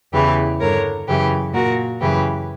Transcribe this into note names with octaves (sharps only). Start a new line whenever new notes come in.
E2 C#3 E3 G4 B4
G2 D3 A#4 C#5
F#2 C#3 E3 G4 B4
A#2 F#4 A#4
F#2 C#3 E3 G4 B4